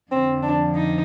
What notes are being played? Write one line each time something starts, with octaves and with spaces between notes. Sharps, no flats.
F2 D3 F3 C4
D4
D#4